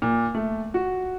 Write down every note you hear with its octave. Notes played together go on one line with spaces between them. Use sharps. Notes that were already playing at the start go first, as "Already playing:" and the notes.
A#2
A3
F#4